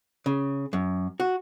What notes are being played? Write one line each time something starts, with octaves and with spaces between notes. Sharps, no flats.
C#3
F#2
F#4